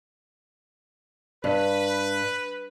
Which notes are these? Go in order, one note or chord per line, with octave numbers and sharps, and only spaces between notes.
G2 B4